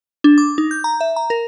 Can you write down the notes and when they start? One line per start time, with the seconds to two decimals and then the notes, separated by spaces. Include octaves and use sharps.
0.24 D4
0.38 D6
0.58 D#4
0.71 G6
0.84 A#5
1.01 E5
1.16 A#5
1.30 A#4